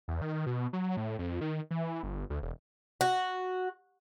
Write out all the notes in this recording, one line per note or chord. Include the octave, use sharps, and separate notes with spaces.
E2
D#3
B2
F#3
A2
F2
D#3
E3
G1
D2
E1
F#4